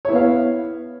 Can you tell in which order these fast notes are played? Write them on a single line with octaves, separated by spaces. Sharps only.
C#5 E4 B3 F5